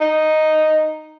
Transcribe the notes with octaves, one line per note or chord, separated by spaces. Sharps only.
D#4